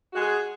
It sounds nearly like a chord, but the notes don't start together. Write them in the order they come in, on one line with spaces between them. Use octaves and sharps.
F#4 G#3 G#4